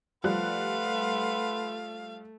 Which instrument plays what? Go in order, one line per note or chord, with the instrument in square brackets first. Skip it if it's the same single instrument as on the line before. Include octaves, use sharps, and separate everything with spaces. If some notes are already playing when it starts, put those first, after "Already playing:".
[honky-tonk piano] F3 G3 F#6 [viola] A3 [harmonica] B4 F#5 C6 [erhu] F5